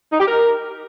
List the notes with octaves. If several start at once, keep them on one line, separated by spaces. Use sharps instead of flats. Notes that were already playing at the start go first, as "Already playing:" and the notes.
D#4
G4
A#4